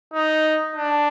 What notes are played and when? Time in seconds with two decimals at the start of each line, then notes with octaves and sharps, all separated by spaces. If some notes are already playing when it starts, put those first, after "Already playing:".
0.14 D#4
0.76 D4